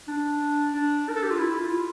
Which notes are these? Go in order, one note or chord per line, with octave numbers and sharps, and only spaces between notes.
D4
D4
A#4
A4
G4
F4
E4
F4